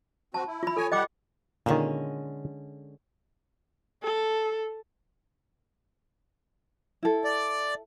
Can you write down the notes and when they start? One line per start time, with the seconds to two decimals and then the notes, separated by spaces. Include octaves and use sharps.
0.34 C4 F#4 A5
0.47 E4
0.63 F4 B5
0.77 F4 A4 C#5 G#5
0.92 G3 G4 D#5 F#5 G5 D6
1.66 A#2 D3 D#3 G#3 C#4
4.03 A4
7.03 E4 A4
7.24 D5